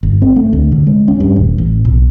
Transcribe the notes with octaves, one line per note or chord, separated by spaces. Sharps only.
G1
C4
A3
D2
D3
G#3
C#4
G2
D#1
A1
B1